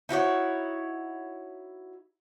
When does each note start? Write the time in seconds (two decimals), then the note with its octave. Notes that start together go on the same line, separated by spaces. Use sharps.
0.09 D#4 E4 F#4 C#5